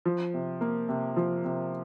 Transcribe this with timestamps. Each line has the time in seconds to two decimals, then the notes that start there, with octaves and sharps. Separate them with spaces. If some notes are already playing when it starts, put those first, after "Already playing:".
0.05 F3
0.34 C3
0.61 A#3
0.89 C3
1.17 F3
1.44 C3